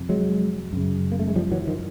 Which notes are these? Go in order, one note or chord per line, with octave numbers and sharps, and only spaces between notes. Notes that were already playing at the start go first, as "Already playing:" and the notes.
Already playing: F2 C3
F#3 G#3
F#2 C#3
A#3
A3
G#3
F3 G3
E3 F#3
D#3 F3